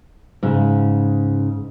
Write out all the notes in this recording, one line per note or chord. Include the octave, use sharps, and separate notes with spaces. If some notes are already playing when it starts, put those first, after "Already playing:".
G#2 C#3